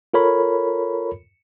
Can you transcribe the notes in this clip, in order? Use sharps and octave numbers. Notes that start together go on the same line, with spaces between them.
F4 A4 A#4 C#5 B5